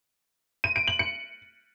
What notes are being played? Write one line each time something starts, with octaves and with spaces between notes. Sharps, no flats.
D#7
D7
F#7
C#7